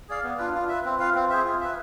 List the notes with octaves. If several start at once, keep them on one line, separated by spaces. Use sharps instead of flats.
G#4 D5 F5
B3
D4 F4 B4
F4
B4 E5
C4
F4 B4 F5
C4
G#4 C5 E5
F4
B4 E5